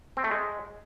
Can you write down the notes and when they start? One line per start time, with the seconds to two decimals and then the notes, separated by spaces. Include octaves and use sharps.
0.17 C4
0.24 A3
0.31 G#3